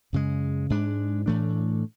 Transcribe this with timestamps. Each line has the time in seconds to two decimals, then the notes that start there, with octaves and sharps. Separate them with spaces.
0.13 F#2 C#3 G#3
0.70 G#2 G#3 D4
1.26 A2 E3 A3 D4